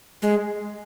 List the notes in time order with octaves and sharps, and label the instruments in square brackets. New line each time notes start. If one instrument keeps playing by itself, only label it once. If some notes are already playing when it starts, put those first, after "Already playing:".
[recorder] G#3